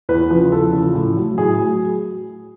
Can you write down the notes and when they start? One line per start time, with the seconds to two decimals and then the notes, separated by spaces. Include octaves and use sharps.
0.09 E2 B4
0.31 C#3 F3
0.52 E2 A4
0.73 C#3 F3
0.95 A2
1.16 F#3
1.38 A2 G#4
1.59 F#3